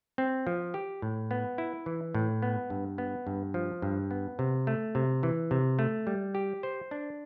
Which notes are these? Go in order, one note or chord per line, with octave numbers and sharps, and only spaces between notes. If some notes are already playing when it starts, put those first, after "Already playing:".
C4
F3
G4
A2
B3
E4
E3
A2
B3
G2
B3
G2
F3
G2
B3
C3
A3
C3
E3
C3
A3
G3
G4
C5
D4